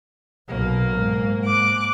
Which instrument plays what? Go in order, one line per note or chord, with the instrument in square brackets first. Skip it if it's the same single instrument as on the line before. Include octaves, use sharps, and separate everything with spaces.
[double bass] B1 B2 [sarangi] A#3
[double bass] G#2
[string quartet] D6 F#6